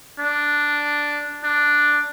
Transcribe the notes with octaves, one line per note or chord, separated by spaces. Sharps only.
D4
D4